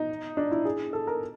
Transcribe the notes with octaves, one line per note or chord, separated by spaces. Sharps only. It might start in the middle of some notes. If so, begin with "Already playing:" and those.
Already playing: D#4
D4
E4
G#4
A4
A#4